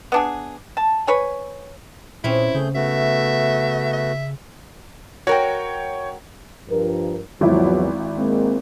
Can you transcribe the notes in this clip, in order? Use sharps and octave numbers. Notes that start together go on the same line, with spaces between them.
B3 D4 G#4
A5
B4 C#5 G#5
A#2 C4 C#4 E4 G#4 B4
C#3 A3 G#4 G6
A3 B3 F#4 E5
E5
F#4 A#4 C#5 G5
G2 F3 A#4
G#1 E2 F3 F#3 E4
G#3 A#3 C4